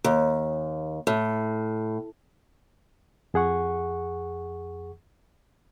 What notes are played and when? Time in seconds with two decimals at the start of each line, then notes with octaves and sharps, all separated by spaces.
0.04 D#2
1.07 A2
3.34 F2 G#4 F#5 C#6